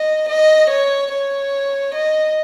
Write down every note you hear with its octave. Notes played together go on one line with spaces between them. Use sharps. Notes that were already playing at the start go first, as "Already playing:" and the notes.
Already playing: D#5
D#5
C#5
C#5
D#5